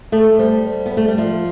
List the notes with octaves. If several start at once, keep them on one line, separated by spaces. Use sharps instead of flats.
A3 A4
G3 C5
C5
B3
A3 C5
G3
F3 E5